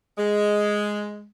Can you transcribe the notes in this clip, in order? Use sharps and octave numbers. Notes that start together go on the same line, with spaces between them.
G#3